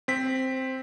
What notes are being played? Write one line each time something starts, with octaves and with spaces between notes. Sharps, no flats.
C4 B6